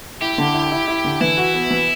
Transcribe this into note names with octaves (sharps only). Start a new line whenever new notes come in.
E4 G4
D3
E4
E4
E4
D3
E3 E4
F#4
B3
E3